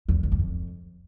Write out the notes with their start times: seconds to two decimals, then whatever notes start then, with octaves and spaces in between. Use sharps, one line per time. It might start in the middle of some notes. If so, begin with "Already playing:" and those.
0.08 E2
0.23 F2
0.32 E2
0.39 F2